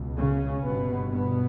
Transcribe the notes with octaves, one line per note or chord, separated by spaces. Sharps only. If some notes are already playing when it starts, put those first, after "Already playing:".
Already playing: C#2 B2
C#3 C#4
G1 G2 B2 B3
B2 B3